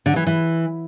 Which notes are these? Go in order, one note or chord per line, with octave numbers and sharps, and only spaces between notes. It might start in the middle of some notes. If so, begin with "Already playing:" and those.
D3
E3
E3